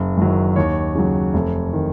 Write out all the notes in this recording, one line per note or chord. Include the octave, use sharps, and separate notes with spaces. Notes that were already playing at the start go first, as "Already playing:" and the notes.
Already playing: F#1
F#2 D#3 F#3
D#2 C#5
C#3 F#3
F1
D#3